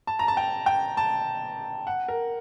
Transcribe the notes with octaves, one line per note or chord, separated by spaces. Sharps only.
A5
A#5
A5
G5
G5
A5
F#5
A#4